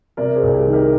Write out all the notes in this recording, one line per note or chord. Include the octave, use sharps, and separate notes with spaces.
C3 A#4 D5
G#4 C5
C2
G4
D#3
G4 A#4